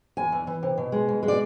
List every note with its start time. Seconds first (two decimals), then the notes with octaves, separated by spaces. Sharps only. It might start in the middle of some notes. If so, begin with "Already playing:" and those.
0.17 E2 G#5
0.32 E3
0.47 E3
0.63 C3
0.78 B2
0.92 G#3
1.09 B2
1.23 G#3
1.28 D5